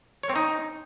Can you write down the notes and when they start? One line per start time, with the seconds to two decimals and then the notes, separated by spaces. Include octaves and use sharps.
0.23 C#5
0.29 C4
0.35 D#4